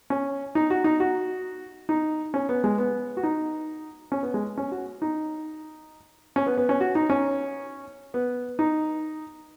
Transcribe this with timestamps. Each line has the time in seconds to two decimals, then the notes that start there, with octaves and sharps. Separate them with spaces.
0.10 C#4
0.55 D#4
0.70 F#4
0.84 D#4
1.00 F#4
1.89 D#4
2.34 C#4
2.49 B3
2.64 G#3
2.78 B3
3.17 F#4
3.23 D#4
4.12 C#4
4.23 B3
4.34 G#3
4.57 C#4
4.72 F#4
5.02 D#4
6.36 C#4
6.47 B3
6.57 B3
6.69 C#4
6.80 F#4
6.95 D#4
7.10 C#4
8.14 B3
8.59 D#4